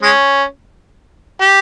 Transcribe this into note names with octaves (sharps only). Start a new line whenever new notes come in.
G#3 C#4
G4